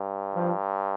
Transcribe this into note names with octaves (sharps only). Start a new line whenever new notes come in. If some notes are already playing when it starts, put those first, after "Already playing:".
Already playing: G2
F3